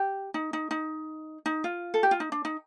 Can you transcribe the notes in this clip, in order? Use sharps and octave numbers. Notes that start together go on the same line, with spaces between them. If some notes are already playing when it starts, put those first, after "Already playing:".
Already playing: G4
D#4
D#4
D#4
D#4
F4
A4
G4
F4
D#4
D4
D#4